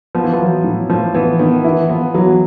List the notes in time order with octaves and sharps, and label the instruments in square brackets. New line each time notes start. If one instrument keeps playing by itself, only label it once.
[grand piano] F3 [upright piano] B3
[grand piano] E3
F3
[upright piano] F#3
A2
[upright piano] A2 [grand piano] F3
[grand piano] E3 [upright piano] B3
[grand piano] D#3 [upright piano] B3
[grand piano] E3 [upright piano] E4
[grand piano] F3 [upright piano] B3
[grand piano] E3 [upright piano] F#3